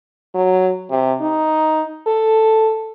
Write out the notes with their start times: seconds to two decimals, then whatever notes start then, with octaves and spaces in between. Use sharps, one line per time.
0.35 F#3
0.90 C3
1.21 D#4
2.07 A4